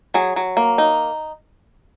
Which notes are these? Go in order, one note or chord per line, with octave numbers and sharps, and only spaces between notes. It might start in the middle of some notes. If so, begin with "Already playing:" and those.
F#3 G#4
F#3
A#3
D#4